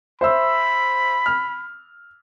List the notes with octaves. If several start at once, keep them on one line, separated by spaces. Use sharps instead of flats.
C5 E5 B5 E6
F6